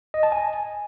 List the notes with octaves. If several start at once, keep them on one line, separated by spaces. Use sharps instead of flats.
D#5
A5
G#5